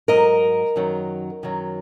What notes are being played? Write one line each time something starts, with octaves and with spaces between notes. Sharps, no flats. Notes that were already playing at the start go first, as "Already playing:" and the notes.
G#2 F#3 A#4 D#5
F#2 D#3 F#3
F#2 D#3 F#3